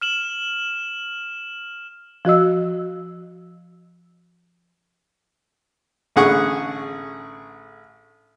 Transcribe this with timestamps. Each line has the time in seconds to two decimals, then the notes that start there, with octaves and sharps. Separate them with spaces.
0.01 F6 E7 F#7
2.25 F3 F#4 D#5 E6
6.16 A1 D3 G#4 F#5 C#6 D#6